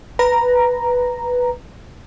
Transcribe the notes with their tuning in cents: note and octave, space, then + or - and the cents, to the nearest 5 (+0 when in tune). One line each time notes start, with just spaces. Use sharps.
B4 +0 A#5 +0